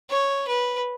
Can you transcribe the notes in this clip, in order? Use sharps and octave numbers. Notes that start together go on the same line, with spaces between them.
C#5
B4